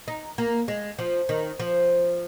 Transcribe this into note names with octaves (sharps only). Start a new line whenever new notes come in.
D#4
A#3
G#3
F3
D#3
F3